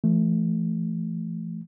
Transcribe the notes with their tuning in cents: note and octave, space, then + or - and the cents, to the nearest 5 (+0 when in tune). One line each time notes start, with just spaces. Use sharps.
E3 +45 A3 -5